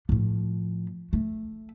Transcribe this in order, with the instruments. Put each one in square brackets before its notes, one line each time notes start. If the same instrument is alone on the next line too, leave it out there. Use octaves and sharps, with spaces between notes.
[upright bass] A2 F3
A3